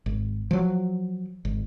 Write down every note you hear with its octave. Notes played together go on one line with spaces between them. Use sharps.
G#1
F3 F#3
G#1